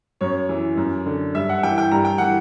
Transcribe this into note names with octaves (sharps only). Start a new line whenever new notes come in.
F#2 C#5
E3
F#2
D3
G2 E5
F#5
E3 G5
G5
G2 A#5
G5
E3 F#5